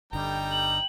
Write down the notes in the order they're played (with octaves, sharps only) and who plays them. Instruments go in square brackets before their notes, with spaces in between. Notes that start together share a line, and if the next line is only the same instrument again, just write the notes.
[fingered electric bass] G1 D3 [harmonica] G3 D#4 A#5 [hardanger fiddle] G5
[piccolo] F#7